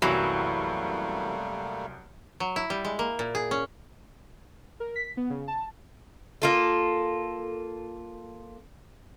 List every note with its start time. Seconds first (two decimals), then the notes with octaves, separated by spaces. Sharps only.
0.02 C2 F#2 E3 F#3 G3 A3 A#3
2.40 F#3
2.56 E4
2.70 G3
2.85 G#3
2.99 A#3
3.19 A#2
3.35 G#4
3.51 C#4
4.80 A#4
4.96 B6
5.17 B3
5.30 C#3
5.48 A5
6.42 A#3 F4 A4